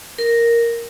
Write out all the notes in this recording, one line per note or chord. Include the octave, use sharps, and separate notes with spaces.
A#4